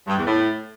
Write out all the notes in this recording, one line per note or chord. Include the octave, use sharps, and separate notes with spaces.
G2
E2
A2